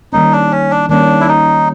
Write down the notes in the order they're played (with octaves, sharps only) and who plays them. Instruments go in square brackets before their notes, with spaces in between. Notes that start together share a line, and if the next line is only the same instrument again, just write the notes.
[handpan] D#3 G3 A#3 C#4 [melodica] D#4
[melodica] D4
C#4
D4
[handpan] D#3 G3 A#3 C#4 [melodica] D4
[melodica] E4
D#4